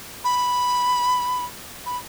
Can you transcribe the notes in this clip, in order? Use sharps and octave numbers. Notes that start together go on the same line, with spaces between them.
B5
B5